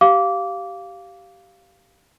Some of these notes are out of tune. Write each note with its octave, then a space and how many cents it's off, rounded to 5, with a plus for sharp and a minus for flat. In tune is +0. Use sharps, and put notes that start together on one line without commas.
G4 -15 F5 +0 D6 -20